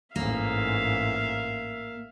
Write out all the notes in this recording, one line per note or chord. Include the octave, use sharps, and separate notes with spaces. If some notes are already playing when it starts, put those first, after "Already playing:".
A1 G#2 A#3 E5 F5